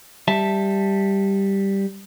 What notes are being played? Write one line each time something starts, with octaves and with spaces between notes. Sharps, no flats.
G3 E5 A5